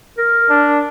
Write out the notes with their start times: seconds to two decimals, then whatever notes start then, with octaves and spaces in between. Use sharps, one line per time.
0.18 A#4
0.50 D4